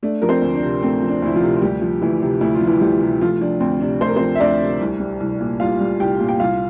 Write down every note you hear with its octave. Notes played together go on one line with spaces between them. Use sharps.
A3 D4
F3 A#4
C4 C5
D2
D4
C3
A3 C4
F3
D4
D2 E4
F3 F4
C3
F4
D2 G3 G4
F3
D2 E3 E4
C3
D2 E4
F4
F3
E3 E4
D2 G3 G4
C3
F3 A3 F4
F3 D4
D2 C4
C3 D4
A3 C5
A#4
C4 C5
F3
E5
D2 D4 D5
C3
C2
G3
C2
A#2
C2 F4 F5
G3
C2 G4 G5
A#2
G5
C2 F4 F5